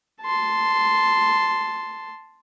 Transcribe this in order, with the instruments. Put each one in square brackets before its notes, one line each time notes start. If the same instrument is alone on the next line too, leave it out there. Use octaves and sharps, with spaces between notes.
[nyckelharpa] A5 C6